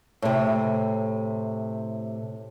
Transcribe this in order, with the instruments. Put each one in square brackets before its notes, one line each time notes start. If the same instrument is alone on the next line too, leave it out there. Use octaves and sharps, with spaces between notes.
[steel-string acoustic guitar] A2 C3